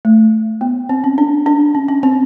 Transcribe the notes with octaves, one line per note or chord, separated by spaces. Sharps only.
A3
B3
C4
C#4
D4
D4
C#4
C#4
C4